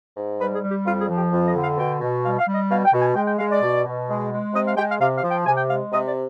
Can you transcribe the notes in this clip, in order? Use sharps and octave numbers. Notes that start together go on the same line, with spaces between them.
G#2
G3 B4
G#4
G3
G4
F2 F4
G#4
F3
G4
F2
D#5
D3
F5
B2 G5
B2
G3 F5
F5
G3
D#5
B2 F5
G5
B2
G#5
G#3 G5
G5
G#3 F5
D5
B2
B2
G#3
G#3
C3 D#5
F5
G#3 G5
F5
C3 F5
F5
F3
G5
C3 G#5
G5
G#3 F5
C3 D#5
D5